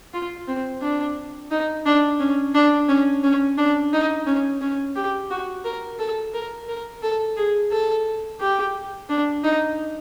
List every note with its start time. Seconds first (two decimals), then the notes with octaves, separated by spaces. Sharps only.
0.14 F4
0.48 C4
0.82 D4
1.51 D#4
1.86 D4
2.20 C#4
2.55 D4
2.89 C#4
3.24 C#4
3.58 D4
3.93 D#4
4.27 C#4
4.62 C#4
4.96 G4
5.31 F#4
5.65 A#4
5.99 A4
6.34 A#4
6.68 A#4
7.03 A4
7.37 G#4
7.72 A4
8.41 G4
9.10 D4
9.44 D#4